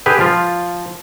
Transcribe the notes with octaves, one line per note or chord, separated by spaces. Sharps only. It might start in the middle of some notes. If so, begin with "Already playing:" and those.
D3 G4 G#4 B4
F3 F4